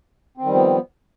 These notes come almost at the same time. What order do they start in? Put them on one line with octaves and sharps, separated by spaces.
C4 D#3 G3 F3 B3